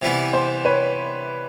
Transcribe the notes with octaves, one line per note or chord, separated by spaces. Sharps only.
C3 E3 G3 B3 E4
C5
B4 C#5